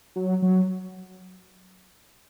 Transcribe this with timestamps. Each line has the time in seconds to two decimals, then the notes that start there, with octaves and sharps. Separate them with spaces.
0.16 F#3
0.42 F#3